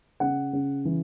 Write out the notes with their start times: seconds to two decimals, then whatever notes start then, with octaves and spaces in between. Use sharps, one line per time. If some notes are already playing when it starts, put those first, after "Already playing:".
0.20 C#3 F#5
0.53 C#3
0.85 E3